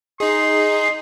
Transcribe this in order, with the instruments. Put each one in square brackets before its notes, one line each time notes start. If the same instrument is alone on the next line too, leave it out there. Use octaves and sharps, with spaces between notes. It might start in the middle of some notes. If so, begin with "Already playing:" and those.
[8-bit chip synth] D#4 G#4 [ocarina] D#5 [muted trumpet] C6